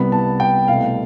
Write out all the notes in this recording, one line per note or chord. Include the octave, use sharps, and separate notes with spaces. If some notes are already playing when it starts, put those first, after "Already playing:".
Already playing: C2 C3 G3 B3 B5
A5
G5
C2 B2 A3 F5